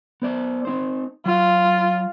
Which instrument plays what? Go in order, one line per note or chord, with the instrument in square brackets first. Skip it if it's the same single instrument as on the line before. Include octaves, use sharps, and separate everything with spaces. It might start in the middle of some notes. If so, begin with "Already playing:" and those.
[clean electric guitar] B3 C5 D5
C4 D#4 C5
[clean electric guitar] F#3 [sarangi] F4